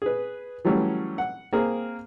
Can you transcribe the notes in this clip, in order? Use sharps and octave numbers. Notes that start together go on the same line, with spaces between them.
G#4 B4
E3 F#3 G3 A3 C#4 E4
F#5
A#3 C4 G#4 A#4